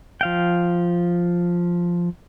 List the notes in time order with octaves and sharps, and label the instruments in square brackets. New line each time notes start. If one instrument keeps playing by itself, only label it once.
[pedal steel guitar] F3 F5 G5